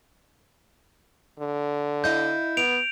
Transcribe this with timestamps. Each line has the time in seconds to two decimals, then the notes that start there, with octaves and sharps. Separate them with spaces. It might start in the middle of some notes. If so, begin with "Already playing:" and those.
1.40 D3
2.04 E4 D#5 F5 G6
2.57 B3 D7 F7